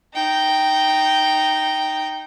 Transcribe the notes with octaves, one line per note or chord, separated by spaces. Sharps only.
D#4 G5